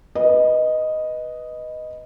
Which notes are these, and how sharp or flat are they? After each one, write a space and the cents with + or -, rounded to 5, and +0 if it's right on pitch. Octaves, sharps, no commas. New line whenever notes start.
B4 +0 D#5 +0